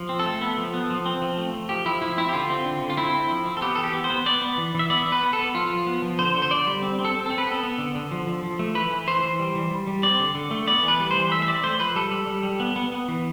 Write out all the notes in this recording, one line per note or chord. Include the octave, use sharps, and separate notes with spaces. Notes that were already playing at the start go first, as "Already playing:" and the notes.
Already playing: F3
C4
A4
A3
B3
F3
B3
F3
C4
F3
A3
F3
F3 G4
F3 E4
F3 E4
C4 E4
G4
D3 F4
C4
D3
D3
F4
C4 E4
C4
F3
C4
A4
B3 G4
E3 A4
G4
B3
C5
B3
B3 D5
B3
E3
E3 E5
B3 D5
B3
B4
B3
A4
B3
F3 F4
F3
B3
F3
D3 C5
D3
C5
D3 D5
G3
C4
C4
A4
C4
C4 A4
B4
B3
A4
B3
D3
D3
F3
F3
F3
A3
E3 B4
E3
E3 C5
E3
G3
E3
G3
G3
C4 D5
D3
D3
A3
B3 D5
E3
B4
G3
E3 C5
A3 E5
E5
C4 D5
A3 C5
F3 B4
G3 A4
G3
G3
G3
B3
B3
B3
E3